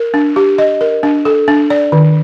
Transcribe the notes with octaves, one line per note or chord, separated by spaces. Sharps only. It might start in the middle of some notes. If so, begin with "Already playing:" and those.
Already playing: A#4
D4
G4
D#5
A#4
D4
A4
D4
D5
D#3